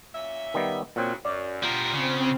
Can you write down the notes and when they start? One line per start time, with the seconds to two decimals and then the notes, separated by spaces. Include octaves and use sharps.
0.14 A#2 C#4 E5
0.54 D#3 G3 B3
0.96 A#2 C#3 F#3 C4
1.25 F#2 D5
1.63 G3 B3 D4 F4 A#4
1.94 C#3 C4